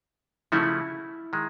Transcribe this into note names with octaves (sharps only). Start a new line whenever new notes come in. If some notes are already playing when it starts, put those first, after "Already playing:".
C#3 F3 A3 C#4 E4 F#4
D#3 G#3